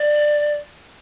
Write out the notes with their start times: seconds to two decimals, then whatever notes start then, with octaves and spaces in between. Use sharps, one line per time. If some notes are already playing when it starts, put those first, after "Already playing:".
Already playing: D5